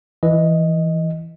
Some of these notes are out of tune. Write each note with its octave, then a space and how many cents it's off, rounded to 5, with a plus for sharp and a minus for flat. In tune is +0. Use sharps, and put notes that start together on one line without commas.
E3 +0 D#5 +0